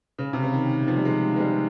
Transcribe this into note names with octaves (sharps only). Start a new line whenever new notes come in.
C#3
C3
C#3
D#3
D#3
F3
G3
G#3
G#3
G3